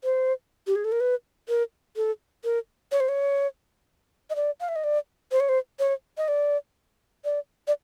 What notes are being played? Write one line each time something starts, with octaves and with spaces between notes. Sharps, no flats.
C5
G4
G#4
A4
A#4
B4
A#4
A4
A#4
C#5
C5
C#5
D#5
D5
F5
E5
D#5
D5
C5
C#5
C5
C#5
D#5
D5
D5
D5